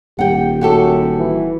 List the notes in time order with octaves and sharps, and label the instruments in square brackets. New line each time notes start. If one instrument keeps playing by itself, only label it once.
[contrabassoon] D#1 [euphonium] G4 [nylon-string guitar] F#5 G5
[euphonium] F#2 [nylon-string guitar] F#4 G4 A4
[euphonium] E3